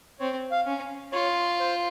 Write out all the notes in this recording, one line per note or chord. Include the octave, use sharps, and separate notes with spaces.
C4 C#5
F5
C#4
F4 C#5
C5